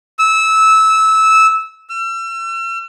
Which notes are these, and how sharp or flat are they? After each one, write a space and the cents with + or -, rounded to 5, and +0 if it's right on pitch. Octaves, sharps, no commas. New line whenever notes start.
E6 -15
E6 +40